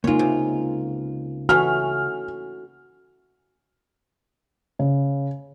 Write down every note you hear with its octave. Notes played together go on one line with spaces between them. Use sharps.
C#2 G#3 A#3 D#4 F4 C#5
C3
E3 A3 C#4 F#4 F6
C#3